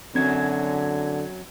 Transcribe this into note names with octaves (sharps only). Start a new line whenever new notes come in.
F#2 D3 F#3 C4 G#6